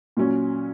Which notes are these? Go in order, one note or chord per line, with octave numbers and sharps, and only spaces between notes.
A#2 F#3 C#4